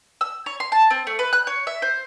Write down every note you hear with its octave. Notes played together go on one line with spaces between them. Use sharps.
E6
C#5
C6
A5
C4
A3
B4
F#6
C#5
E5
C5